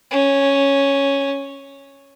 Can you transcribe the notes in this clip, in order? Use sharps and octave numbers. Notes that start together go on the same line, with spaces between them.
C#4